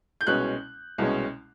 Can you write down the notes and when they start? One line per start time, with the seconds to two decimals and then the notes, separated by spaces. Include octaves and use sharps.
0.21 G6
0.27 C2 B2 G#3 C#4 F#6
0.98 C2 B2 G#3 C#4